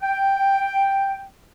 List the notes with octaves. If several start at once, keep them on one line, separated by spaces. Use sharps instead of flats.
G5